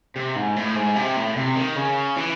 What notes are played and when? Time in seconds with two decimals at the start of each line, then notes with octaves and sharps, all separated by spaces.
0.16 C3
0.36 G#2
0.56 A2
0.75 G#2
0.96 C3
1.16 A2
1.36 C3
1.56 D#3
1.76 C#3
2.17 E3